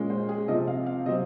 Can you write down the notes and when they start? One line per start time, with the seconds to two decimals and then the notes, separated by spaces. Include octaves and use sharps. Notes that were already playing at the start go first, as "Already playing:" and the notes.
Already playing: A#2 G#3 C#4
0.10 C5
0.29 G#4
0.48 C3 F3 C4 D#5
0.68 F5
0.86 F5
1.05 C3 F#3 C4 D#5